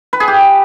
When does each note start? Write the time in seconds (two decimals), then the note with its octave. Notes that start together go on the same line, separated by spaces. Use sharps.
0.13 B4
0.20 G#4
0.28 G4